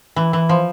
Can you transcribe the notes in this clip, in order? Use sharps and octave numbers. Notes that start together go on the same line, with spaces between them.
E3
E3
F3